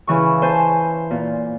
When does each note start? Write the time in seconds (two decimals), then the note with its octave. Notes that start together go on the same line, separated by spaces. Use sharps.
0.07 C#3 E3 C#6
0.42 C5 G#5 A5
1.11 A#2